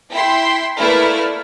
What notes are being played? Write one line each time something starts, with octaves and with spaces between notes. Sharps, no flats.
E4 G5 C6 B6
A3 A#3 E4 B4 D5 F6